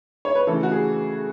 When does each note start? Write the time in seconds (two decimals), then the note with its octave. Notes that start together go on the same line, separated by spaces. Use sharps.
0.25 C#5
0.35 B4
0.47 C#3 E3 A3 A4
0.63 F#4
0.72 G#4